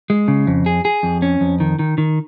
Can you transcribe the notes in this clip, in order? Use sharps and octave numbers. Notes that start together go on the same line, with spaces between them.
G#3
C#3
F2
G#4
G#4
F2
C#4
F2
D#3
D#3
D#3